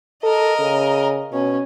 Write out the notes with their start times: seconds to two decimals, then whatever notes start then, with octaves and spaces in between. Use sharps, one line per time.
0.23 A4 A#4 D#5
0.60 C#3
1.32 B2 C#4